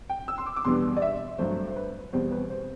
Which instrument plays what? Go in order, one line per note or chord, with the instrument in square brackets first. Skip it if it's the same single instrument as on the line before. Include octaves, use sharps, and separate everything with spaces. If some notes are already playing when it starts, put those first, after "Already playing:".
[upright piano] G5
E6
C6
D6
D6
E2 B2 G3 B3 D4 C6
D5
E5
G2 F#3 A3 C5
C5
B4
E2 B2 G3 C4 C5
B4
C5